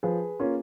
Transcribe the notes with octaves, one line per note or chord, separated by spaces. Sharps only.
F3 G#4 B4
A#3 C#4 F4